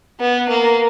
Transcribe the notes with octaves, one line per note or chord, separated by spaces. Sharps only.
B3
A#3